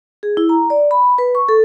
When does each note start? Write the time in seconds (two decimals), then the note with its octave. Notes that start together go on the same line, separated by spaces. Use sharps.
0.23 G#4
0.37 E4
0.49 A#5
0.70 D5
0.91 B5
1.18 B4
1.35 C#6
1.49 A4